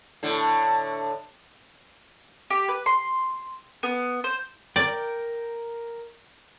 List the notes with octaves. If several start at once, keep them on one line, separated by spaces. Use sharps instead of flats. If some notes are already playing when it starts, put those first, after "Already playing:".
A2 D3
G4
B4
C6
B3
C5
A#4 D5 G5